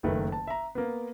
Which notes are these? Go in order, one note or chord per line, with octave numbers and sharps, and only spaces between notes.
F#1 D#3 A3 B4
A5
E5 A#5
A#3 B3